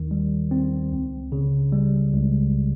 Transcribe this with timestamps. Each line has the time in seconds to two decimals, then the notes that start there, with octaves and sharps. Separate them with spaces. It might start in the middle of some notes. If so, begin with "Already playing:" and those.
Already playing: D#2 D#3
0.11 G3
0.51 C4
0.92 C#2
1.32 C#3
1.72 G3
2.13 C#2